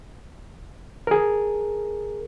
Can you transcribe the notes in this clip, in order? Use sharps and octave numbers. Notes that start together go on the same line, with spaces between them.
G#4 A#4